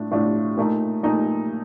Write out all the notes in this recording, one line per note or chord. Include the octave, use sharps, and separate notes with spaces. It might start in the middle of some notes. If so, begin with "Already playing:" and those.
Already playing: A2 A3 D4 F4
A2 A3 D4 F4
A#2 A3 D#4
A#2 A3 D#4